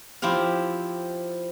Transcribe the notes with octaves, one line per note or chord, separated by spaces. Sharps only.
F3 C4 E4 G4 F5